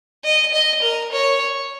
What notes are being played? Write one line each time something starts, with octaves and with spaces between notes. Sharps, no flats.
D#5
D#5
A#4
C#5